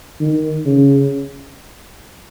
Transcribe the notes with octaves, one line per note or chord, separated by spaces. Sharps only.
D#3
C#3